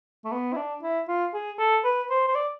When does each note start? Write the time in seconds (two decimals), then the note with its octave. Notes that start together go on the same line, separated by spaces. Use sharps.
0.25 A3
0.32 B3
0.53 E4
0.57 D4
0.82 E4
1.08 F4
1.34 G#4
1.59 A4
1.85 B4
2.10 C5
2.28 C5
2.35 D5